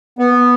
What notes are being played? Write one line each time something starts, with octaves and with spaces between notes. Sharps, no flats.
B3